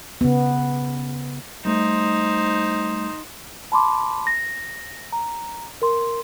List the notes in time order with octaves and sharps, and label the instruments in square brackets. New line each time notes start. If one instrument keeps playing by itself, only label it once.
[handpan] C#3 B3
[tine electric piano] G3 A3 [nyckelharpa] D#4 C5
[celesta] A5 B5 C6 D6
A#6
A#5
A#4 C6